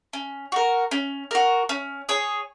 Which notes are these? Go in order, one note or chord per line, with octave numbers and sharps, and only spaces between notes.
C#4
F#4 A#4
C#4
F#4 A#4
C#4
G#4 C#5